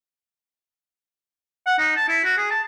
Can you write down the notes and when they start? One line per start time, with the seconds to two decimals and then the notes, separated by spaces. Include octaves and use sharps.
1.66 F#5
1.79 D#4
1.96 A5
2.09 E4
2.24 F#4
2.37 G#4
2.51 A5